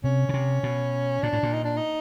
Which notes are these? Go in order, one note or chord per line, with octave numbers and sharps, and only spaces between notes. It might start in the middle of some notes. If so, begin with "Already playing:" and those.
C3 C#4
C#3
C3
B2
A#2 D4
A2
A#2
D#4
D4
D#4